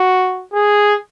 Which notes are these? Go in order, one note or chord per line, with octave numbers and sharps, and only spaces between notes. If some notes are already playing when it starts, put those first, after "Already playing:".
Already playing: F#4
G#4